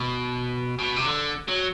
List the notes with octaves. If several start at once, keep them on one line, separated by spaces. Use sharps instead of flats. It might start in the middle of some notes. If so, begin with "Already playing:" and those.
Already playing: B2
B2
C3
D3
F#3